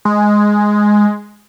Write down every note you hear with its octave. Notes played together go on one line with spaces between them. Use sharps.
G#3